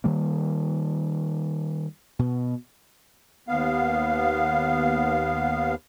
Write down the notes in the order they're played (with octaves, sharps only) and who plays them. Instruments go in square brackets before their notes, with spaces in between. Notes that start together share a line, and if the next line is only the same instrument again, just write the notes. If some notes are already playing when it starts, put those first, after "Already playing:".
[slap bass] D#3 G3 A#3
B2
[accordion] D#2 B3 F5